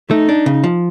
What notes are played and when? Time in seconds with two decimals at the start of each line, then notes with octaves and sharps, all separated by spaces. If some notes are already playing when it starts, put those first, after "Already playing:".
0.10 A3 D#4
0.29 D4
0.46 C#3
0.64 F3